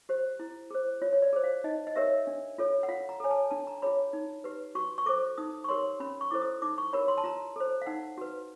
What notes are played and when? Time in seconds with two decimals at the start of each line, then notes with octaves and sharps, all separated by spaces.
0.09 G4 C5
0.40 E4
0.71 G#4 C5
1.02 F4 C#5
1.13 C#5
1.22 D5
1.33 G#4 C5
1.44 F5
1.64 D#4 D#5
1.87 D#5
1.95 G4 A#4 C#5 E5
2.27 D4
2.58 F4 A4 C#5
2.83 F#5
2.88 F4 F5
3.09 A#5
3.20 A4 C#5 G#5
3.31 A5
3.51 D4 A5
3.67 A#5
3.82 F4 G#4 C#5 B5
4.13 D#4
4.44 G4 B4
4.75 F#4 C#6
4.98 C#6
5.06 A4 C5 D6
5.38 D#4 D#6
5.64 C#6
5.68 G4 A#4 C#5 C6
6.00 C#4 B5
6.21 C#6
6.31 E4 A4 C5 D6
6.42 D#6
6.62 D#4 D6
6.78 C#6
6.93 G4 A#4 C#5 B5
7.08 C6
7.18 A5
7.24 F4 A#5
7.56 A4 C5
7.82 F5
7.86 D#4 F#5
8.18 F#4 B4